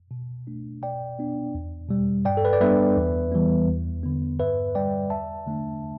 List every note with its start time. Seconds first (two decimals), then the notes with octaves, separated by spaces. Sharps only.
0.11 B2
0.47 A3 D4
0.82 B2 D5 G5
1.19 B3 D4
1.55 E2
1.89 B2 G3
2.25 G2 D5 G5
2.37 A4
2.45 B4
2.53 D5
2.61 G3 B3 D4 B4 E5
2.97 E2
3.32 E3 G3 B3
3.68 E2
4.03 D3 B3
4.40 G2 B4 E5
4.75 D3 G3 D5 G5
5.10 E2 E5 A5
5.46 D3 A3 D4